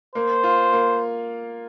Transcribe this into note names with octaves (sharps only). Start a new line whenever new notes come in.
A#3 C5
F4
A#3